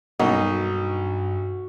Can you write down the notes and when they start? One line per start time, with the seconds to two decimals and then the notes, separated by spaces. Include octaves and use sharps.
0.20 B1 G2 A#3 D#4 F#4